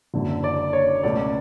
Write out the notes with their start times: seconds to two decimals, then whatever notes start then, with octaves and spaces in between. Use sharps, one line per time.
0.14 F#1 F#2 D3 F#3
0.44 D5
0.73 C#5
1.03 C#2 B2 A3 D5